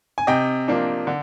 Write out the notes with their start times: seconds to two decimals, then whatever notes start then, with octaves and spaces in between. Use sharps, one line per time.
0.18 G#5
0.27 C3 D#5 G5
0.68 F3 A#3 D4
1.07 D3